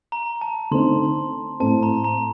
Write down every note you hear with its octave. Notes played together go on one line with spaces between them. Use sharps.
A#5
A5
D3 A3 C4 D#4 C6
A2 A3 C4 A5
A#5
A#5